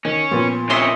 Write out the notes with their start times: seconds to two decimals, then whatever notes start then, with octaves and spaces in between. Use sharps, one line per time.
0.05 D#3 C#4
0.31 A#2 F3 B3
0.70 C3 C#4 D#5 E5 C6